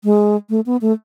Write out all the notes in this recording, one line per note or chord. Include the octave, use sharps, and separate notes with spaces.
G#3
A3
B3
A3